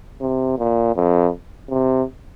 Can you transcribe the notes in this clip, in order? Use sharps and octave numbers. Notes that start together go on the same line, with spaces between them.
C3
A#2
F2
C3